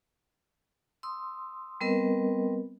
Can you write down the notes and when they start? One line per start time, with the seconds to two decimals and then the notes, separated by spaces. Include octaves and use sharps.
1.03 C6 D#6 E6
1.81 G3 B3 C4 A#4 B4 D#5